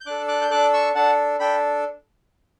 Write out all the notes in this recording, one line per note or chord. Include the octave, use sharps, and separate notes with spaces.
G6
D4 A4 D6 F#6
D6 F#6
G6
D4 A4 D6 F#6
C#6 E6
D4 A4 F#5 A5
D4 A4 G5 B5